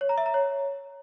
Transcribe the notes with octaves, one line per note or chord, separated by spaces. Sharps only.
C#5
A#5
E5
A#5
C#5